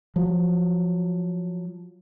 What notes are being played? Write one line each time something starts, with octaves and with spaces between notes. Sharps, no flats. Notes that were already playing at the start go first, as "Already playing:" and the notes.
F3 F#3